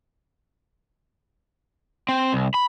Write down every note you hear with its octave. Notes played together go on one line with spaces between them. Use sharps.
C4
C2
B5